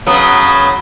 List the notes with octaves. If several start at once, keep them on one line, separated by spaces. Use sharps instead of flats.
C#3 F#3 B3